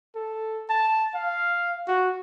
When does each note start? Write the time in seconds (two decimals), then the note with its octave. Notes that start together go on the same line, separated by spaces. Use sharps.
0.15 A4
0.69 A5
1.14 F5
1.88 F#4